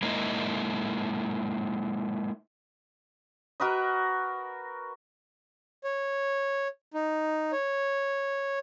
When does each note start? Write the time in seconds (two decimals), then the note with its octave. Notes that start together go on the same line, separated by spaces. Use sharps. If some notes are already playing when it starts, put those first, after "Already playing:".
0.02 G#3 A#3 D#4 E4 D#5
3.60 F#4 A#4 B4 D#5
5.84 C#5
6.94 D#4
7.52 C#5